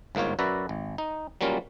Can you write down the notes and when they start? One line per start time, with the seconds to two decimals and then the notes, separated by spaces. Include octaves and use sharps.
0.15 G1 G#2 A#3 F4 C#5
0.39 F#2 F#4 B4 D5 E5 A#5
0.69 G#1
0.98 D#4
1.41 F#3 G3 A#3 C#4 F4